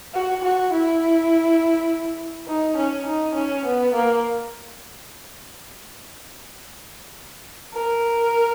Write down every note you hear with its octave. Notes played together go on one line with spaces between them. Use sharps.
F#4
F#4
E4
D#4
C#4
D#4
C#4
B3
A#3
A#4